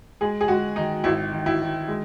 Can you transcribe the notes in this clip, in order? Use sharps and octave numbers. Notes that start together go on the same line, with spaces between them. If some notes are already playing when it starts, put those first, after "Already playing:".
G#3 G#4
G#4
G#3 F#4
D#3 D#4
G#1 E4
D#3
E4
D#3
G#3